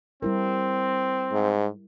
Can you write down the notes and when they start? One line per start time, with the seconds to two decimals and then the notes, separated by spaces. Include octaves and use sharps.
0.22 G3 C4 E4 A#4
1.32 G#2